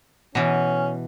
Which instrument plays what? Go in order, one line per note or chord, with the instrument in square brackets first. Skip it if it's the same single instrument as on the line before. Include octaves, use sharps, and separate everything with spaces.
[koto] B2 E3 [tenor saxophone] C#4